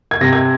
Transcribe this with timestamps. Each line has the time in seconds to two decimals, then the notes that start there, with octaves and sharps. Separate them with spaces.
0.11 G#6
0.21 C3 A#6
0.33 G#6